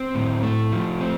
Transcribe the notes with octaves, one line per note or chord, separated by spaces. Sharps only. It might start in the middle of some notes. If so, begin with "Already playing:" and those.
Already playing: C4
A2
A3
F3
C4